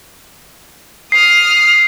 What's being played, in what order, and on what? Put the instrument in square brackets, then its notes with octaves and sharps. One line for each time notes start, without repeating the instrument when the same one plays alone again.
[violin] D#6 F6 [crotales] C7